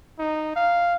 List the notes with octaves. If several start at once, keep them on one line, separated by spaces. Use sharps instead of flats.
D#4
F5